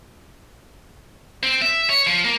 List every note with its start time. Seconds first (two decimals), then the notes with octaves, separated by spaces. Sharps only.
1.43 C4
1.62 E5
1.90 C#5
2.07 F3
2.25 A#3